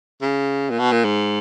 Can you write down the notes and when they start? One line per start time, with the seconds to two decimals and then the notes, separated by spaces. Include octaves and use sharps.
0.22 C#3
0.70 A#2
0.79 B2
0.92 A#2
1.05 G#2